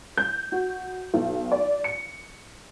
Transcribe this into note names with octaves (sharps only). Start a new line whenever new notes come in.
G6
F#4
B1
D5
C#7